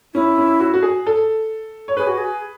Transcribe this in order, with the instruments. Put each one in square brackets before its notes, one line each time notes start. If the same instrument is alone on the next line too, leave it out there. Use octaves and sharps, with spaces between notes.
[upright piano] C#4 [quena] E4
[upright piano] C#4
F#4
F#4
G#4
A4
C#5
[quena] G#4 [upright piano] B4
[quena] F#4
G#4